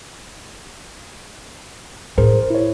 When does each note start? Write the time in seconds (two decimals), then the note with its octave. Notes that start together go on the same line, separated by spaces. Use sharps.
2.18 A2 G#4 A#4 C5
2.50 E4 C#5